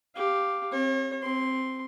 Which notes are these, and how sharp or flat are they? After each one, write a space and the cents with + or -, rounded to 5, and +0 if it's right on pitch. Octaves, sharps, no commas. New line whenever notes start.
G4 +0 F5 +0
C4 +20 C#5 -40
C4 +0 C6 +0